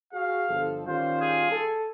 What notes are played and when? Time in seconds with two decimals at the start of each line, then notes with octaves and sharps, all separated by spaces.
0.13 F#4 G#4 F5
0.48 G1 F3 A4
0.87 D#3 G3 C#4 F4 C5
1.20 G#4
1.52 A4